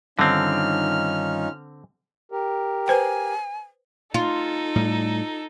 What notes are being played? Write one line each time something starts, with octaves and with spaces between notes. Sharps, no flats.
G2 D3 D#3 C4 C#4 D#4 F4 F6
G4 A#4
B4 C5 G5 G#5
D#4 F4 A4
A2 G3